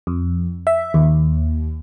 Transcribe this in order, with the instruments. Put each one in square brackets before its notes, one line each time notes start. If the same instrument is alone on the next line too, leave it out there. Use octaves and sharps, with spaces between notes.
[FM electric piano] F2
E5
D#2